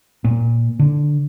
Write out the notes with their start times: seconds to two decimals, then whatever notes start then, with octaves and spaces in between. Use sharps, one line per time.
0.24 A#2
0.79 D3